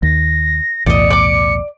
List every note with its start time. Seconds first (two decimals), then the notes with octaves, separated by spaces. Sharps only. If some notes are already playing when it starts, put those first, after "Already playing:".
0.03 D#2 A#6
0.86 B1 E2 A2 D5 D#5 C#7
1.10 D5 D6